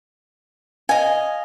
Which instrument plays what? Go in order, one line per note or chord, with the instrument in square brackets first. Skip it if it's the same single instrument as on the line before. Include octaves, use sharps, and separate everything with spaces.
[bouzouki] D#5 F5 [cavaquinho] G#5